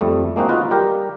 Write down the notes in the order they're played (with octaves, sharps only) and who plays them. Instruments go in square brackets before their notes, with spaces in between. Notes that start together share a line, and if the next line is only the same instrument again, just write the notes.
[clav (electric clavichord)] F2 G3 A3
G#3 A#3 C4 D#4 F#4
D#4 F4 F#4 B4
G3 G4 A#4